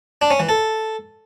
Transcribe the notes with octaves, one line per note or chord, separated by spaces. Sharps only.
D4
C#4
E3
A4